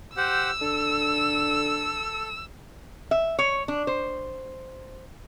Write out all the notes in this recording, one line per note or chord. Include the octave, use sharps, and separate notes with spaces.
G4 C5 F#5 E6
D3 A4
E5
C#5
D4
C5